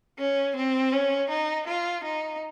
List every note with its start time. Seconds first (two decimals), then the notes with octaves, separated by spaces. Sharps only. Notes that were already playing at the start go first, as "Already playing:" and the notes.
0.18 C#4
0.56 C4
0.92 C#4
1.30 D#4
1.67 F4
2.05 D#4